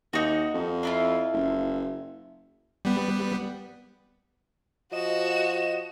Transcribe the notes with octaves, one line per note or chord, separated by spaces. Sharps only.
D#2 D#4 F#4
F2
D4 E4 F4
F#1
G3 B3
F3 F#4 D#5 E7